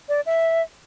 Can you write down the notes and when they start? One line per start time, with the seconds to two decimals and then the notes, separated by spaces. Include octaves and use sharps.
0.09 D5
0.26 E5